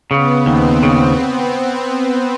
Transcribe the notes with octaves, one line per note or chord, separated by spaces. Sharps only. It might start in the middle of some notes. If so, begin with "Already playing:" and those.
C#3 B3
D#2 C4
C#3 B3